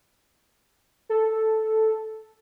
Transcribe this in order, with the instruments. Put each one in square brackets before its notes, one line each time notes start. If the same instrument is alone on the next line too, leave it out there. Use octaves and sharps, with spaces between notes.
[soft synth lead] A4